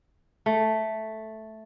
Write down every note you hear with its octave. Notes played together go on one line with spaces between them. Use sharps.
A3